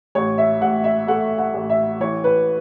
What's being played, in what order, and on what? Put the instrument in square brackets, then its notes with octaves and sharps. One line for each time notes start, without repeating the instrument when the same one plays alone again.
[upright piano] A1 C#5
E5
A1 F#5
E5
A3 F#5
F#5
A1
E5
E3 C#5
B4